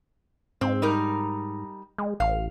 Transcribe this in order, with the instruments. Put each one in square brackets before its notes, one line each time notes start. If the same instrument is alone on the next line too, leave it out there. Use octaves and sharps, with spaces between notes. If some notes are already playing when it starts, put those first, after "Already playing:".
[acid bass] G#2 [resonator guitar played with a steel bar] C4
[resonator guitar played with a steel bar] G3 D#4 A#4
[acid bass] G#3
[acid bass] A1 [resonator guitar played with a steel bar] F5